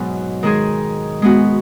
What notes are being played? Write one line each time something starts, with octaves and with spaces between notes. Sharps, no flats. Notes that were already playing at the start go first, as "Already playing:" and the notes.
Already playing: G#2 B2 F#3 B3
D#3 G#3 D#4 G#4
G#3 B3 F#4